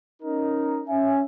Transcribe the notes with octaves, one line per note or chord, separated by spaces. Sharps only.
C#4 D#4 A#4
C#4 E5 G#5